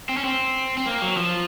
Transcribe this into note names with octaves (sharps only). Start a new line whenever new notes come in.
C4
C#4
C4
C4
A#3
F#3
F3